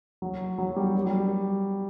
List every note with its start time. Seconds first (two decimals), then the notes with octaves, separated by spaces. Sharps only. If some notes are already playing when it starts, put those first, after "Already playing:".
0.22 F#3
0.58 F#3
0.76 G3
0.95 F#3
1.07 G3